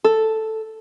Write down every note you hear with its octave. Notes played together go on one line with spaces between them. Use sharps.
A4